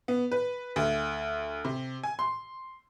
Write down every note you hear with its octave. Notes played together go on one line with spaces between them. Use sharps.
B3
B4
D2
C3
G#5
C6